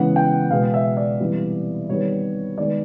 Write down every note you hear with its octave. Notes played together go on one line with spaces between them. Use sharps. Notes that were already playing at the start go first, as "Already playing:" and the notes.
Already playing: C#3 E3 G#3 B3 F#5
G5
B2 G#3 B3 F5
E5
D5
C3 E3 G3 B3
C3 D#3 G3 B3 C#5
D#3 G#3 B3 D5